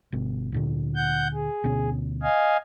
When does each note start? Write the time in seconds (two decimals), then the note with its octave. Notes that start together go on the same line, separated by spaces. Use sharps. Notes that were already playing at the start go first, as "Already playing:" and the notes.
0.12 G1 B2
0.52 D2 A#2 D3
0.96 F#5 G6
1.34 G#4
1.64 D2 B2 C#4
2.22 D#5 F5 G#5